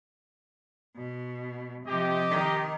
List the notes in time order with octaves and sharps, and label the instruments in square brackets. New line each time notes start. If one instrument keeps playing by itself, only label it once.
[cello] B2
[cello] C3 F3 [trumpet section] G4 D#5
[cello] D#3